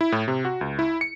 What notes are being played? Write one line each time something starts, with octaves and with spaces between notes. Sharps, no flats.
E4
A2
C3
F#4
C#2
E4
C#7